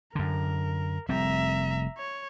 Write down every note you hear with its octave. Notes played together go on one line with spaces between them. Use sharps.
F#2 D3 A#4
F1 G3 C4 E5 A#5
C#5